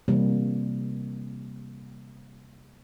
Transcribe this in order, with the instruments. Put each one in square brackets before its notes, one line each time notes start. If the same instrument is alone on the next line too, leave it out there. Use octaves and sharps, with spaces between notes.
[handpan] C3 E3 G3 A#3